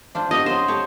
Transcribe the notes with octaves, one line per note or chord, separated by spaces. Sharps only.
D4 F4 C5
F#4 G4 D#5 F5
F#3 C4 C5
G4 A4 C#5